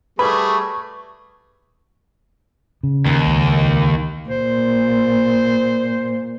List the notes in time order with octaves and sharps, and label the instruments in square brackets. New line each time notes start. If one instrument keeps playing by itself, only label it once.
[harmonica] G3 A3 G#4 [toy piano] B4 [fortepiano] B5 [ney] C#6
[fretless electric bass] C#3
[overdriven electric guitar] D#2
[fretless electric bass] C#2
[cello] A#2 [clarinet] C5